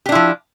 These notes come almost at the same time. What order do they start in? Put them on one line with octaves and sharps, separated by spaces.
G4 D4 E4 F3